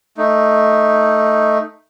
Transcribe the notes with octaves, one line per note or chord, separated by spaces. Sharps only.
A3 D#4